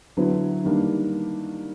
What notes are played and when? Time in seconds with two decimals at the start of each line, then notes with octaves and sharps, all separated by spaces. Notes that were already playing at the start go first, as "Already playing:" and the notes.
0.17 D3 F#3 B3 E4
0.64 D#3 G3 A#3 D4